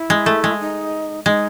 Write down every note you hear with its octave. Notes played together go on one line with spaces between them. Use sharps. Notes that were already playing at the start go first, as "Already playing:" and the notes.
Already playing: E4
G#3
A3
G#3
D#4
G#3 D#4